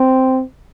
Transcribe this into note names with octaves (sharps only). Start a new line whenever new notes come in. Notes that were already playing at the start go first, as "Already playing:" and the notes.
Already playing: C4